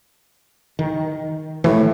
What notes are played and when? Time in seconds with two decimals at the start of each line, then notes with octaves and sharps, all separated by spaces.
0.79 D#3
1.64 A2 E3 F#3 A3